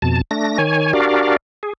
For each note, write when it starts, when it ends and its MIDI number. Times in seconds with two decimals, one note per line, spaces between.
0.02 0.21 41
0.02 0.21 47
0.02 0.21 81
0.31 0.58 57
0.31 0.58 62
0.31 0.58 94
0.58 0.93 51
0.58 0.93 73
0.58 0.93 80
0.93 1.36 62
0.93 1.36 66
0.93 1.36 67
0.93 1.36 70
0.93 1.36 74
0.93 1.36 77
1.63 1.73 68